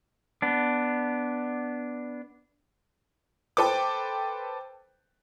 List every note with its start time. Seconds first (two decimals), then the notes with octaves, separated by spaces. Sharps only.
0.42 B3 D4
3.57 A4 B4 C5 G5 D6